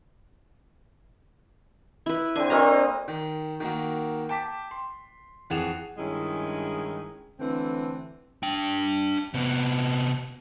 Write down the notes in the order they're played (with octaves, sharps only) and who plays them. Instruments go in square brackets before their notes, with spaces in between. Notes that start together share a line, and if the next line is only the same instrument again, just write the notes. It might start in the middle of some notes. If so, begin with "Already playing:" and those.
[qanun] E4 B4
[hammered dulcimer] D3 C4 [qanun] G#5
[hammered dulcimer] F#3 A#3 C4 [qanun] B4 D#5 A#5
[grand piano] D#3
D#3 A#3 F#4
G5 A5 D6 B6
C6
F2 E3 G#4 F#5 E7 F7
[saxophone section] G2 D#3 G#3 C#4 E4
D3 E3 A3 C4
[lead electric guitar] D4 G5
C3 B3